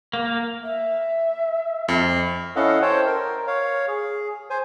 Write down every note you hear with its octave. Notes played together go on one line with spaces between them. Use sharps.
A#3
E5
F2
C#4 E4 A4 D#5 F5 F#5
C5 C#5 G5 A5
A#4
C#5 F5
G#4
C5 G#5